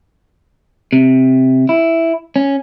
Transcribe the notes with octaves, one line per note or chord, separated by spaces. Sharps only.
C3
E4
C#4